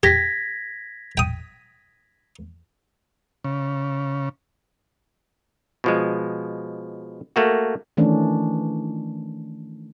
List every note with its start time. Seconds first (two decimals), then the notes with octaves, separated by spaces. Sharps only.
0.03 G4 G#6 A#6 B6
1.17 G5 D#6
3.44 C#3
5.84 B2 F3 G#3
7.36 A3 A#3 F#4
7.97 D#3 E3 A3 C#4 D4